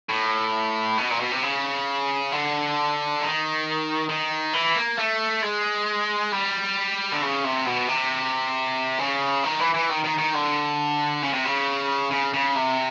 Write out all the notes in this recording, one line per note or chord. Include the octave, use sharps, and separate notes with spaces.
A2
B2
A#2
B2
C3
C#3
D3
D#3
D#3
E3
A#3
A3
G#3
G3
D3
C#3
C3
B2
C3
C#3
D#3
E3
E3
D#3
D#3
D#3
D3
C#3
C3
C#3
C#3
C#3
C3